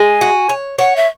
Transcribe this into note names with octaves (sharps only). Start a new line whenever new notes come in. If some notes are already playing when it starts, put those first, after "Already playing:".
Already playing: G#3 G#5
F#4
C#5
C#5 F#5
E5